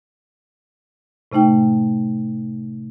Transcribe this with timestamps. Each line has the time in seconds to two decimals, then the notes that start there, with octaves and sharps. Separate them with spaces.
1.32 A2 C3 A3 D#4 G5